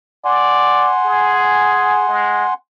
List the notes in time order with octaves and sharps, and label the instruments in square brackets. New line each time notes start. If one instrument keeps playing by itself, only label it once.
[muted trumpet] D5 [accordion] F#5 G#5 C6
[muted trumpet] G#4
G#3